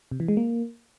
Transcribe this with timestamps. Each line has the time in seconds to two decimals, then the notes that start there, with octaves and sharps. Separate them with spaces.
0.11 C3
0.20 E3
0.28 G#3
0.37 A#3